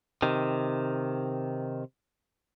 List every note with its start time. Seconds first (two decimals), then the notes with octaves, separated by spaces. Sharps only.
0.22 C3 D#3